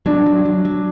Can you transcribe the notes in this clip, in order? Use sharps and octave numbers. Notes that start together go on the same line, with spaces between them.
F#3 D4
F#3
F#3
F#3